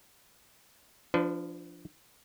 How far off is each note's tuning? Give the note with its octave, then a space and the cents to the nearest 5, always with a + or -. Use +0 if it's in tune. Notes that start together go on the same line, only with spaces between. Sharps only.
F3 -10 D4 +0 B4 +35